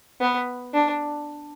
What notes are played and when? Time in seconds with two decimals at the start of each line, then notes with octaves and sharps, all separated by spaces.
0.21 B3
0.74 D4